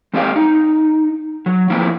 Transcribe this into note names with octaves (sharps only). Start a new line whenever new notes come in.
G#3 C4 G4 D#5 F5
D#4
F#3
F3 A#3 C4 E4 F4